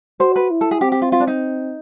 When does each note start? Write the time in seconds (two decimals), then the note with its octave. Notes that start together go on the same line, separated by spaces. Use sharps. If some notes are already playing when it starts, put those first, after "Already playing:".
0.20 F#4 C5
0.36 B4
0.51 E4
0.61 A4
0.71 G#4
0.81 C4 G4
0.92 G4
1.02 F4
1.12 F4
1.20 D4
1.27 D#4